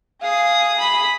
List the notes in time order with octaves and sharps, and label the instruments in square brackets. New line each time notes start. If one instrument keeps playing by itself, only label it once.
[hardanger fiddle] G#4 D#6 [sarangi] F5
[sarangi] B5